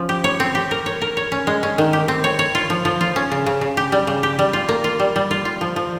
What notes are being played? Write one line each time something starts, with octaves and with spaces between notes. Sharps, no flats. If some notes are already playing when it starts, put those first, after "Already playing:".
Already playing: F3 C#4
G4
C#5
C4
G4
A#4
C#5
A#4
C#5
C#4
G#3
C#4
D#3
G4
C4
C#5
C#5
F4
F3
F3
F4
C#4
C#3
C#3
C#3
G4
G3
C#3
G4
G3
F4
A#3
F4
G3
G3
F4
F4
F3
F3